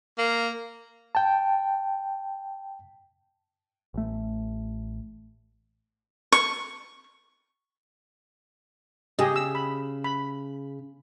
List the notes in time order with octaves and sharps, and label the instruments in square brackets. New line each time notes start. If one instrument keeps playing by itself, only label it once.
[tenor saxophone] A#3
[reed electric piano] G5 A5
[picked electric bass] A1 A3
[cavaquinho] C#6
[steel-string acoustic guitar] C#3 [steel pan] G4 G#4 D#5
[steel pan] E6
B5
B5